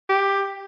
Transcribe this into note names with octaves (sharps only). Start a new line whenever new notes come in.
G4